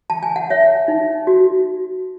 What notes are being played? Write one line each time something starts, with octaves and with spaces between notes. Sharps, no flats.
A5
G#5
F#5
C#5 E5
D#4
F#4